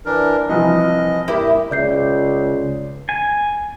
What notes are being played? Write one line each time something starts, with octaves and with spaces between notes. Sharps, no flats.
E3 D4 A#4
C2 E3 F3 D#5
A#3 E4 G4
C#2 C#3 D5 G6 C7
G#5